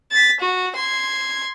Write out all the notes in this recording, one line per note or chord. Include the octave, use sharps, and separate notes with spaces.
A6 B6
F#4
C6 G#6